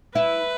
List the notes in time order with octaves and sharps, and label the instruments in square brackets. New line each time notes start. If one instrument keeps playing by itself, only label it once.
[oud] E4 [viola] B4